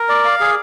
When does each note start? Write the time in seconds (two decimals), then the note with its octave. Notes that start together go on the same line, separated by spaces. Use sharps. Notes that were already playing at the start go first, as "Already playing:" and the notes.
Already playing: A#4
0.09 D5
0.25 F5
0.40 G#4